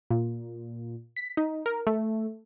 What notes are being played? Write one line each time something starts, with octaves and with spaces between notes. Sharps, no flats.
A#2
B6
D#4
A#4
A3